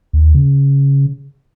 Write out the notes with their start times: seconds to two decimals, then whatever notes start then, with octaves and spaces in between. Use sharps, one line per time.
0.13 D#2
0.34 C#3